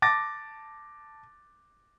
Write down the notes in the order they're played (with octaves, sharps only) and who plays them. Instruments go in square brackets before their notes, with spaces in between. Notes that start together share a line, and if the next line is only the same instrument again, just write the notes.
[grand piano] A5 D6 A6 A#6